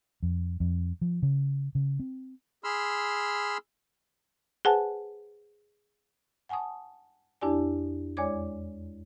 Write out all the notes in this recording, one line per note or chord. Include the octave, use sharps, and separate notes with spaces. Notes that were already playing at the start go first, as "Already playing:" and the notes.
F2
F2
F3
C#3
C#3
C4
G#4 B5 C6 E6 F6
G#4 B4 C5 F#5 G#5 A5
F#5 G#5 A5 C#6 D#6
F2 D4 E4 G4 D5 G#5
E2 G#3 C#5 D5 D6 G#6